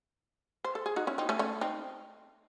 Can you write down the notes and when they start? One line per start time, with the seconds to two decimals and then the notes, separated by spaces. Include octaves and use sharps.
0.64 C5
0.75 A4
0.86 G#4
0.96 D#4 F#4
1.07 C#4 E4
1.18 C4 D#4
1.29 A3 C#4
1.39 A3 C#4
1.61 C4 D#4